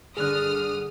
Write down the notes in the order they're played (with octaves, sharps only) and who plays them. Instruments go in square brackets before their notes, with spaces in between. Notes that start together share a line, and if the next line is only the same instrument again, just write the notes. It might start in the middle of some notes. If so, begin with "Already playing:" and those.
[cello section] G2 D3 [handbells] G#4 F#6 [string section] D#6 F6